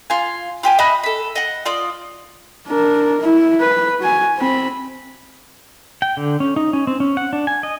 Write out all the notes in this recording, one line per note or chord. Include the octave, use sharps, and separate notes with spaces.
F4 G#5
F4 G4 G#5
D#5 E5 B5 F#6
A4 B5
D#5 F#5
F4 D5 D#5
D4 A#4
E4
B4
F#4 G#5
C4 B5
G5
D3
C#4
D#4
C#4
C4
C#4
F#5
D4
G#5
D#5